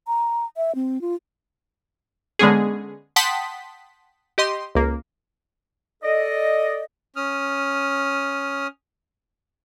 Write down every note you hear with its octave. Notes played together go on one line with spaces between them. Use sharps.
A#5
E5
C4
F4
D3 G#3 B3 C#4 G#4
F#5 G5 A5 C6 D#6 B6
G4 D#5 C6
C#2 A#3
A4 D5 D#5
C#4 D#6 F6